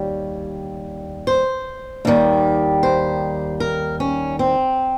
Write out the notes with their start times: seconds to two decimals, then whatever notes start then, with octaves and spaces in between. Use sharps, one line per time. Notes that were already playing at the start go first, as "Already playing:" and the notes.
Already playing: D#2 G3 C#5
1.27 C5
2.05 D#2 D#3 G3
2.83 C5
3.60 A#4
4.00 C#4
4.39 C4